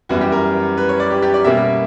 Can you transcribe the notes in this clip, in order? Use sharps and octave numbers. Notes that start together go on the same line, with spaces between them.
F#2 E3 G3 B3 F#4
G4
A#4
B4
C#5
D5
G4
G4
D5
B2 G3 A#3 C#4 E5